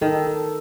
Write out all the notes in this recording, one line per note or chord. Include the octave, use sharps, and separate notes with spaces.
D#3 A4
A4